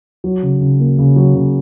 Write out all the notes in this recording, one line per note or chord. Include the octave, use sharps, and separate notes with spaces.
F#3
C#3
C#3
A#3
C#3
F#3
C#3